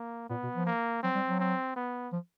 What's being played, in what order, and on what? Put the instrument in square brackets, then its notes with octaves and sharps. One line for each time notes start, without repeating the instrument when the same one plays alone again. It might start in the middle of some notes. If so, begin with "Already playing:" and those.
Already playing: [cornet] A#3
[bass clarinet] A#2 [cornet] B3
[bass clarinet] B2
F3
[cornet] A#3
[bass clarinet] F#3 [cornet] C4
[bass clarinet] G3
F#3
[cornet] C4
B3
[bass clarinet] F3